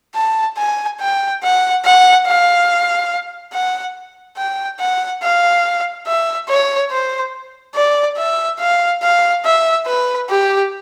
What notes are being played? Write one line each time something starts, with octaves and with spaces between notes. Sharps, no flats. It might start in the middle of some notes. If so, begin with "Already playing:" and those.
A5
G#5
G5
F#5
F#5
F5
F#5
G5
F#5
F5
E5
C#5
C5
D5
E5
F5
F5
E5
B4
G4